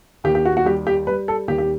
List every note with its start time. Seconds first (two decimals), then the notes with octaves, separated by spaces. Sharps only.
0.24 D#2 G4
0.35 G4
0.45 F#4
0.57 F#4
0.65 G3 G4
0.87 G4
1.07 G3 B4
1.28 A4
1.48 D#2 G4
1.58 G4